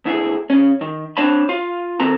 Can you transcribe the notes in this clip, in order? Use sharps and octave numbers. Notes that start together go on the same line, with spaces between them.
D2 E4 G#4
C#3 C#4
D#3
C4 D4 C5 C#5 A5 B5
F4 F5
D#3 C4 A4 A#5